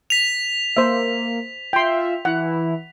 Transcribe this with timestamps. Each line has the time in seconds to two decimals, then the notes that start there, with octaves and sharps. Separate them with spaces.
0.10 B6 F7
0.77 A#3 C5 E5
1.73 F4 E5 G5 C6
2.25 E3 E4 F#5